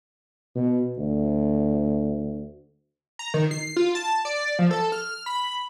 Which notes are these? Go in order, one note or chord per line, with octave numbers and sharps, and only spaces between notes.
B2
D2
A#5
D#3
C7
F4
A5
D5
F3
A4
F6
B5